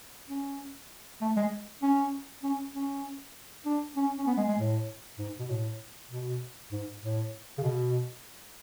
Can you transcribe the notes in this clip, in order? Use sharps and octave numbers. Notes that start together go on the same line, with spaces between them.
C#4
A3
G#3
C#4
C#4
C#4
D4
C#4
C#4
B3
G#3
G#3
A2
G#2
B2
A2
B2
G#2
A2
C#3
B2